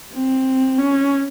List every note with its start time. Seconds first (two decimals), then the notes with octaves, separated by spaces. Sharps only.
0.12 C4
0.78 C#4